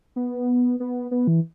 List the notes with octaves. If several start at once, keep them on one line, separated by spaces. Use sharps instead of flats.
B3
B3
B3
E3